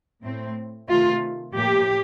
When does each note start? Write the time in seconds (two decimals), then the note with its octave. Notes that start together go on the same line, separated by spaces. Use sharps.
0.23 A2 A3 C4
0.88 C3 D#3 A3 F4
1.54 A2 F3 A#3 G4